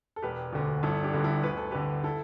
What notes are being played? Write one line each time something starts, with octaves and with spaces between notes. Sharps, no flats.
A4
E1 G4 B4
D2 D3
G1 E4 A4
D4 G4
G2 D3
E4 A4
D2 B4
A4
D3 G4 B4
E4 A4